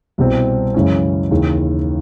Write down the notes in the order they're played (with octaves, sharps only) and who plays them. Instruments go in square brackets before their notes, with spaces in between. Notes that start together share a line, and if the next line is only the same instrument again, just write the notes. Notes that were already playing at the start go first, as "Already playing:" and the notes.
[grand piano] C2 B2 G3 C4 E4
F#2 C#3 E3 G#3 C#4
D#2 C#3 E3